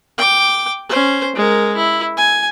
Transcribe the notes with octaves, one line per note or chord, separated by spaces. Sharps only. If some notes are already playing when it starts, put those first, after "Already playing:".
G5 D6
C#4 C5
G#3 A#4
E4
G#5